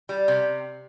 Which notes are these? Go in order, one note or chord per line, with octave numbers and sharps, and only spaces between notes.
G3
C3